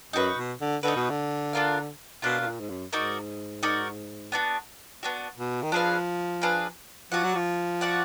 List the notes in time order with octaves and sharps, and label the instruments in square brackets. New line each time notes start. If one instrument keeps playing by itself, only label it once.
[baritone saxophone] F#2 [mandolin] D#4 F#4 B4
[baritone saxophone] B2
D3
[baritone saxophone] D3 [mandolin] D#4 F#4 B4
[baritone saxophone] B2
D3
[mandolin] D4 F4 A#4 F5
[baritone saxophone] B2 [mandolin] D4 F4 A#4 F5
[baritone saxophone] B2
A#2
G#2
F#2
[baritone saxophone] G#2 [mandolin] D#4 F#4 A#4 D5
[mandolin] D#4 F#4 A#4 D5
B3 D4 F#4
B3 D4 F#4
[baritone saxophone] B2
D#3
[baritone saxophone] F3 [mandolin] D4 G#4 B4 F5
[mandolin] D4 G#4 B4 F5
[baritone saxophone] F3 [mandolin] F#4 D5 F#5
[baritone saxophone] F#3
F3
[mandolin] F#4 D5 F#5